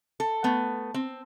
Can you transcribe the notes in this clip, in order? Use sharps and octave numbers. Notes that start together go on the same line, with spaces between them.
A4
A3 B3
C4